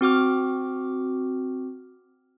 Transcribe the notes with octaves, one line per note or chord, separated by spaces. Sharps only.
C4 F#4 D6 F6